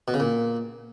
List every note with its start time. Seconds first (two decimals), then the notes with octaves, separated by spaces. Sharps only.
0.08 B2
0.14 C#3
0.20 A#2